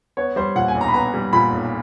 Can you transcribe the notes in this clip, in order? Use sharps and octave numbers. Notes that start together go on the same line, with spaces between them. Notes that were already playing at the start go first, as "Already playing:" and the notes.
B3 C#5
G3 C5
A#2 F#5
G#5
B1
A#5
B5
B3 A#5
G3
A#2 B5
B1